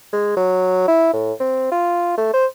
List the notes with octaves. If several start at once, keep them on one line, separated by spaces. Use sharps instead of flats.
G#3
F#3
E4
A2
C4
F4
A3
C5